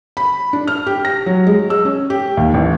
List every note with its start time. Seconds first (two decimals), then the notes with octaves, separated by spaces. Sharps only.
0.17 B5
0.53 D4
0.67 F6
0.86 G4
1.05 A#6
1.26 F#3
1.47 G#3
1.70 E6
1.85 C#4
2.10 G4
2.37 D#2
2.54 A1